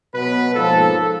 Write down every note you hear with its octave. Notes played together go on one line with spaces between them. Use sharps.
B2 F#3 B3 B4
G#2 F3 A#3 A4